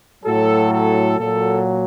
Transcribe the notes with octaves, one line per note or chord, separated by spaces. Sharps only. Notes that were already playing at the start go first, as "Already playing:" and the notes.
A2 F#3 A4
A4
A#2 F#3 A4